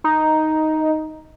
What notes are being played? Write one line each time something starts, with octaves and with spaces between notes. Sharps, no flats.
D#4